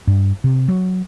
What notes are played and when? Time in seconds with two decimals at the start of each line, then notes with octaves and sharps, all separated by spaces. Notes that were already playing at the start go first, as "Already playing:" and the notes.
0.07 G2
0.44 C3
0.68 F#3